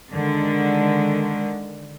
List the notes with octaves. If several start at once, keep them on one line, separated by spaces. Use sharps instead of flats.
D3 D#3 G#3